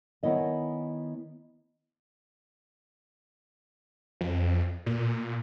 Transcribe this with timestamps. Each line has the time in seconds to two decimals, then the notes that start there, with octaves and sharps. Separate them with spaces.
0.23 D#3 B3 E4 C#5 D#5 G#5
4.21 F2
4.86 A#2